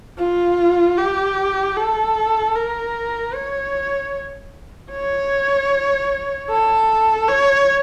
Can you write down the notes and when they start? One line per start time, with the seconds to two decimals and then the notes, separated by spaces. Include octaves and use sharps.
0.18 F4
0.97 G4
1.77 A4
2.55 A#4
3.34 C#5
4.92 C#5
6.50 A4
7.28 C#5